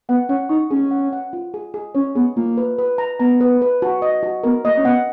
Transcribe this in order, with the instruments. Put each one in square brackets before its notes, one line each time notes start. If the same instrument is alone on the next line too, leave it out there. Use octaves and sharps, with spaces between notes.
[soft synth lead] B3 [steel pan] F#5
[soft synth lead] C#4 [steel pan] F#5
[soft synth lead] D#4 [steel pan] C#6
[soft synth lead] C#4 [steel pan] G#4
[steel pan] F#5
F#5
F4
G#4
G#4
[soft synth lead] C#4 [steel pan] C#5
[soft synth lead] B3 [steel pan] G#4
[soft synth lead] A#3 [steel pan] F4
[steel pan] B4
B4
A#5
[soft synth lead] B3 [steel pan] A#5
[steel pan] B4
B4
F#4
D#5
F#4
[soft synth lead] B3 [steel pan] A#4
[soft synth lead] A#3 [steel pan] D#5
[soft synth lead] C#4
[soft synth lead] B3 [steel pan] F#5